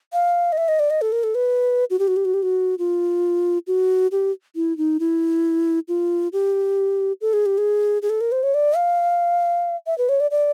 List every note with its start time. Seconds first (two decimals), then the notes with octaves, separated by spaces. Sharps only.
0.13 F5
0.52 D#5
0.58 E5
0.68 D#5
0.80 D5
0.90 D#5
1.02 A4
1.12 A#4
1.23 A4
1.35 B4
1.90 F#4
1.99 G4
2.08 F#4
2.16 G4
2.25 F#4
2.34 G4
2.43 F#4
2.79 F4
3.67 F#4
4.12 G4
4.56 E4
4.78 D#4
5.00 E4
5.88 F4
6.33 G4
7.21 A4
7.33 G#4
7.46 G4
7.58 G#4
8.02 G#4
8.10 A4
8.21 A#4
8.32 C5
8.43 C#5
8.54 D5
8.76 F5
9.87 E5
9.98 B4
10.09 C#5
10.20 D5
10.31 D5